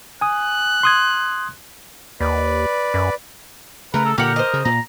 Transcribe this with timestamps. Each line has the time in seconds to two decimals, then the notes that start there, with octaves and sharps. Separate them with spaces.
0.21 G#5 D#6 F#6
0.83 C6 D#6 G#6
2.20 D#2 B4 D5
2.94 F#2
3.94 C#3 A3 A#4 B4 A#5
4.05 A4
4.18 A#2 D3 G4 A#4 F#5
4.36 C5 D#5
4.53 C#3
4.65 A#2 A#5